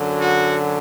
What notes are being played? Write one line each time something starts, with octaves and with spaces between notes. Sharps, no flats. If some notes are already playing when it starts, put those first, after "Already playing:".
Already playing: F#2 D3 F#3
F#4